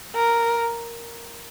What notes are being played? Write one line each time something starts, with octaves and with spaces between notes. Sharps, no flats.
A#4